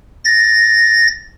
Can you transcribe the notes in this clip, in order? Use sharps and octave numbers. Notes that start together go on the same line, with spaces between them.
A6 A#6